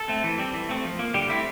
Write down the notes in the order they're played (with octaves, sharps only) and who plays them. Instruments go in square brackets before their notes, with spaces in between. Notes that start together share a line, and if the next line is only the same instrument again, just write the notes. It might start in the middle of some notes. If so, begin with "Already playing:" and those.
Already playing: [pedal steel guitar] A4
A3 C4
E3
G3 C4
E3
A3 C4
F3
A#3
D3 G3 G4
A3 C4 E4